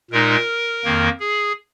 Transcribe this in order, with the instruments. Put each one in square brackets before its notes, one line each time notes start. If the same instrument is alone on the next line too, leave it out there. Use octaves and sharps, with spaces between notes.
[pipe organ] A#2 G#3 D#4 A#4
F2 D#3 A#3
G#4